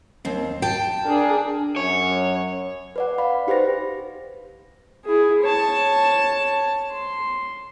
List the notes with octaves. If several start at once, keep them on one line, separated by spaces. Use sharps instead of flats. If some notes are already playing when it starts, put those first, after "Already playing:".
D#2 C4
G5 A5
D4 G#4 A#4
F#2 C#5
B4 D5 F#5
D5 F5 B5
D#4 G4 B4 C5 A#6
E4 G#4
C#5 A5
C6